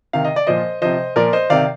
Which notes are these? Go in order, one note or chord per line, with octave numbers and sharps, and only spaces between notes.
C3 D#3 F5
D#5
D5
A#2 F3 C5 D#5
C3 F3 C5 D#5
A#2 F3 A#4 D5
C5 D#5
C3 D#3 D5 F5